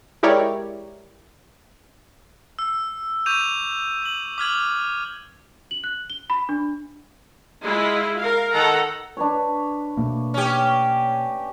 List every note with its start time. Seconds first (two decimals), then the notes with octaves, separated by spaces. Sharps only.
0.23 G#3 E4 G4 A#4 C#5 D5
2.59 E6
3.26 C#6 D6 G6 D#7 F7
4.02 D6 F#7
4.38 D6 F6 G#6 F#7
5.71 F#7
5.84 F#6
6.10 G7
6.30 B5
6.49 D4
7.62 G#3 E4 F4
8.18 A#4 F5
8.52 D#3 A4 F#5 A#5
9.17 D4 B4 C#5
9.97 B2 A3 A#3
10.34 C#4 G4